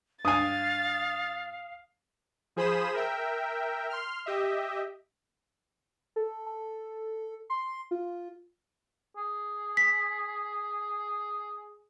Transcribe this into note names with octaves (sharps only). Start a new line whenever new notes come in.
G2 F5 G#5 D#6 A6
F3 G#4 C5 B5 D#6 E7
A#4 E5 G5
C6 F6
G4 D#5 E5
A4
A4
C6
F4
G#4
B6